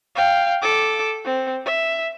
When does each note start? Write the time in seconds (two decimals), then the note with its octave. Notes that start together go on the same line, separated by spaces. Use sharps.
0.15 F5 G5
0.62 A4 D6
1.25 C4
1.66 E5